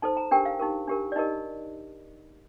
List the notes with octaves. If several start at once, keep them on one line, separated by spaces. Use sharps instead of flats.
D#4 A4 C5 A5
A#5
D4 G4 A#4 G5
F5
D#4 G4 A#4
D4 G4 A#4
D5
D#4 G4 A#4 D#5